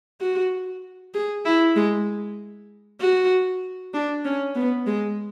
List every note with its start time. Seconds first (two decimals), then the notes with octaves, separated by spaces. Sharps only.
0.21 F#4
1.14 G#4
1.45 E4
1.76 G#3
3.00 F#4
3.94 D4
4.25 C#4
4.56 B3
4.87 G#3